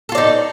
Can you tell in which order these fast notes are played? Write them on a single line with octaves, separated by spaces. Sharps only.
A4 F4 D5 D#4